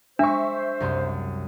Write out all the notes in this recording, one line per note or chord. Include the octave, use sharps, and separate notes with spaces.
G#3 D4 C5 E5 C#6
C2 F#2 C6